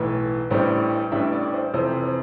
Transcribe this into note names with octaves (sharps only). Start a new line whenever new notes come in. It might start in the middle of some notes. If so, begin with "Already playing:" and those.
Already playing: B1 A2 E3 B4
A1 A2 G3 D4 C5
A1 A2 G3 D4 E5
D5
C5
F2 C3 E3 C5
C5